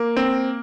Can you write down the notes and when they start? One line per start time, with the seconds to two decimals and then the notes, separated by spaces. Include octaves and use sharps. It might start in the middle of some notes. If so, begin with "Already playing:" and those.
Already playing: A#3
0.17 C4